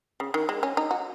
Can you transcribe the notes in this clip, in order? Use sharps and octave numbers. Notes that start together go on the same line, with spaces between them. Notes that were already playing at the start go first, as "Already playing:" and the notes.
C#3
D#3
G#3
C#4
D#4
F#4